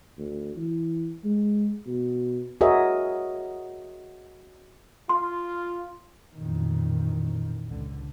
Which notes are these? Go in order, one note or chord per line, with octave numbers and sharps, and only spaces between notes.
D2
E3
G#3
B2
F#4 G#4 A#4 C#5 D#5 E5
F4 C6
A1 F2 A#2 D#3
G#1 C#2 D3